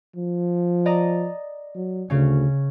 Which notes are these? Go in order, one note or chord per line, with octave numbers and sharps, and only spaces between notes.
F3
D5 D#5 A#5
F#3
D2 C#3 C#4